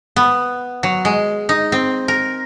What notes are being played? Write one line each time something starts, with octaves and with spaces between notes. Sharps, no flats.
B3
F#3
G#3
D#4
C4
A#4